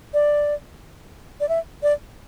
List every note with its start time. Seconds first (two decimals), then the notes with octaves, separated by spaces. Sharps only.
0.14 D5
1.40 D5
1.49 E5
1.83 D5